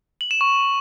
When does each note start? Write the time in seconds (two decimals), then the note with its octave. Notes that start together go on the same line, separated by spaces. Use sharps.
0.21 F#7
0.31 E7
0.41 C#6